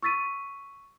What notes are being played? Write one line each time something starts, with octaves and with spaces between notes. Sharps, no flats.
C#6 E6 A6 B6 D#7